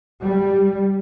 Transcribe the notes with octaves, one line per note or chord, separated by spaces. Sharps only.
G3